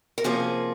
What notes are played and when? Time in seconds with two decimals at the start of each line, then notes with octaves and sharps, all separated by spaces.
0.18 A#4
0.24 C3 F3 A#3 C#4 F4 G#4